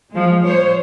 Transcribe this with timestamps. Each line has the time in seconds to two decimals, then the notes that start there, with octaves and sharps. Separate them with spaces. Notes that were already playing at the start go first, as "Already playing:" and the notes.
0.10 F3 G#3
0.44 C5 C#5